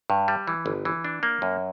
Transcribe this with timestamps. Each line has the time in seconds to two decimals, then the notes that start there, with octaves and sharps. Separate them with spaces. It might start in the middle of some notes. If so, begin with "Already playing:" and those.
0.10 G2
0.28 G3
0.48 E3
0.66 G1
0.85 E3
1.04 D4
1.23 A#3
1.42 F#2